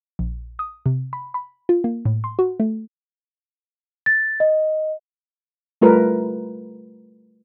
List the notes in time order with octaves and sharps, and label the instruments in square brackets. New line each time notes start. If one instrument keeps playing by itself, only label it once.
[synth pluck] A#1
D#6
C3
B5
B5
F4
A#3
A2
C6
F#4
A3
[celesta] A6
D#5
[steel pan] G3 A3 F4 A#4 B4